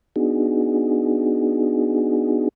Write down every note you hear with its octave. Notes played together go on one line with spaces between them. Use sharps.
B3 D4 D#4 F#4 G#4